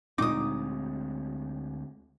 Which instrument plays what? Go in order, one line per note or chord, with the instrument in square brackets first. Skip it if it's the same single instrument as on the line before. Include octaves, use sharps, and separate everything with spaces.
[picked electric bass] D2 G#3 C4 [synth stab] A#2 D#4 [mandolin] D6 D#6